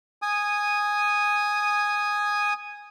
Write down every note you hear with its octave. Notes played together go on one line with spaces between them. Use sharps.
G#5 D#6